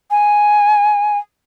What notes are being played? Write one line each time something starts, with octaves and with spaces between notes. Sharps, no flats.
G#5